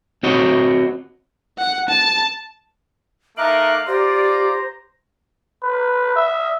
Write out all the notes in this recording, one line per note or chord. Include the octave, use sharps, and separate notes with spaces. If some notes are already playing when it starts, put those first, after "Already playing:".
C4 F#4 C#5 D#5
F#5
A5
A3 D#4 A#4 E5 F5 D6 F#6
F4 G4 C5 D5 A#5
B4
E5